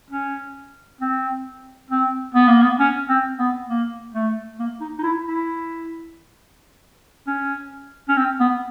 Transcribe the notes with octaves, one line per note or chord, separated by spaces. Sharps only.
C#4
C4
C4
B3
A#3
B3
C#4
C4
B3
A#3
A3
A#3
D#4
D#4
E4
E4
C#4
C#4
C4
B3